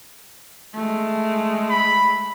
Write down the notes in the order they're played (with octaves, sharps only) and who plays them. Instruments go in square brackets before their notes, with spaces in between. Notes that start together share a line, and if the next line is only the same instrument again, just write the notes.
[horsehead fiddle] G#3 A3
[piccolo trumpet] B5